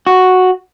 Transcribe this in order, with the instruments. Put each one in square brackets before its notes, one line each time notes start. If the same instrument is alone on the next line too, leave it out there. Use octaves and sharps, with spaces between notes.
[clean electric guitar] F#4